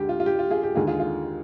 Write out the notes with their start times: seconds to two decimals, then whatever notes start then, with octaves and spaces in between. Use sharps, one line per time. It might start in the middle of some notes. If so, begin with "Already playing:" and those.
Already playing: D2 D3 G#3 G4
0.09 F4
0.20 F4
0.26 G4
0.39 F4
0.51 F4 G#4
0.63 G4
0.75 D#2 D3 G#3 F4 G#4
0.87 F4 G#4
1.00 F4